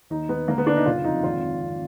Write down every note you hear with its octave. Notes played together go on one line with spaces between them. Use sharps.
D#2 D#4
D#2 B3
D3 A#3
B3
D3 D4
D#4
F#1 F4
F2 D#4
G#1 F4